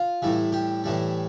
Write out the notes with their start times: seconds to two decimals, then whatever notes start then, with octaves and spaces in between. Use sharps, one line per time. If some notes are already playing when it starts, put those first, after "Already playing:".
Already playing: F4
0.22 A2 E3 G3
0.52 G4
0.84 A2 E3 G3